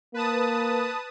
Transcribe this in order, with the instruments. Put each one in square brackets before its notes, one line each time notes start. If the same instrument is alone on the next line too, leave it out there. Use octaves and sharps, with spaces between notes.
[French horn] A#3 [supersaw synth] B4 A5 D#6